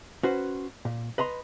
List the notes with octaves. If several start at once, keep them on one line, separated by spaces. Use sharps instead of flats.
C#4 F#4 B4 C5
A#2
B4 D#5 A#5 C6